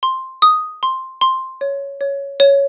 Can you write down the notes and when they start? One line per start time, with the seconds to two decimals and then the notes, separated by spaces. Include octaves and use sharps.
0.03 C6
0.42 D#6
0.83 C6
1.21 C6
1.61 C#5
2.01 C#5
2.40 C#5